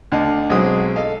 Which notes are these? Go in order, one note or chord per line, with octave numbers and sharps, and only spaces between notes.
D2 D3 D#5 A5
B1 F#3 G#3 C4 D#6
A4 D#5 F5